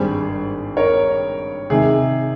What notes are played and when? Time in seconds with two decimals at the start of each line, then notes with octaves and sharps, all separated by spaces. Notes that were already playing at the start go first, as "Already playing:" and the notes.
Already playing: G#1 G2 G3 G#4 C5
0.77 A#4 C#5
1.70 C3 D#3 G#3 G#4